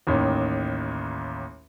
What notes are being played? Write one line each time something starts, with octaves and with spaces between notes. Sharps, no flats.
A1 D#2